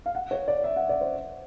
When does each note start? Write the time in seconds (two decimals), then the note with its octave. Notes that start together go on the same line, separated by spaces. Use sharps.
0.06 F5
0.15 F#5
0.31 C#5
0.48 D5
0.64 E5
0.76 F#5
0.89 D5
1.01 C5